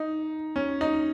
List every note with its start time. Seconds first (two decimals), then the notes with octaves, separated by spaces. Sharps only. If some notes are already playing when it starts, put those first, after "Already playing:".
Already playing: D#4
0.56 C#4
0.81 D#4